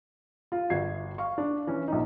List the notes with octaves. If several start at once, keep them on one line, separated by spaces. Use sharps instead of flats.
F4
G1 F#4 G#6 C7
F5 C#6
D4
E3 C#4
A#1 D#4